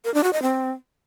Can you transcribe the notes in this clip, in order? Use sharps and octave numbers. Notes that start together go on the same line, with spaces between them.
A#4
D4
F#4
D#5
C4